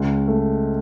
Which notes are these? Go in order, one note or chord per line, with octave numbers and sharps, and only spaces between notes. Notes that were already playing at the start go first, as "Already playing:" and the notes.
Already playing: C#2
A3